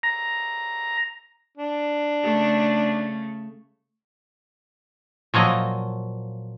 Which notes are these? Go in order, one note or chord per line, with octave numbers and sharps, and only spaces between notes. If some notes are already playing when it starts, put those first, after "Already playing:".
A#5
D4
C#3 A3
A#2 F3 F#3 D#5